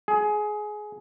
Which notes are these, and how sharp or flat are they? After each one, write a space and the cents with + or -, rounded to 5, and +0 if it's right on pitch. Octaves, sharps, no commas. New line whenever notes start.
G#4 +20